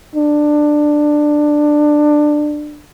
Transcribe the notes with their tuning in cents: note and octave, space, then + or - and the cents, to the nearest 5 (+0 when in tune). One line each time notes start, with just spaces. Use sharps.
D4 +15